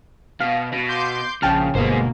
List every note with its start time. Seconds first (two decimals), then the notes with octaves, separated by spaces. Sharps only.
0.40 B2 F5
0.72 B2
0.88 C6 D6 G6
1.42 A#1 C#3 F3 G5 A5 F6
1.75 G1 B2 G#3 A#3 C5